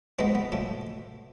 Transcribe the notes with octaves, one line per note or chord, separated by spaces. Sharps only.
G#2 E3 G#3 B3 C4
B3
A2 F3 A3